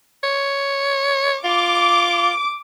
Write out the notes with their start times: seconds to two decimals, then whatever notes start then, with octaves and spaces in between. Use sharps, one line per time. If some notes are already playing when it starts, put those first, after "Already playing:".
0.24 C#5
1.44 F4 D6